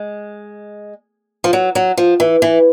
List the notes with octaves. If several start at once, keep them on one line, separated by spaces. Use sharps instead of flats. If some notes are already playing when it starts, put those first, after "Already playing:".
Already playing: G#3
F3
F#3
F#3
F3
E3
E3